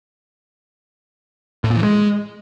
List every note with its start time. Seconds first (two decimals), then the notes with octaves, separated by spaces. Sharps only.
1.64 A2
1.70 A#2
1.77 E3
1.83 G#3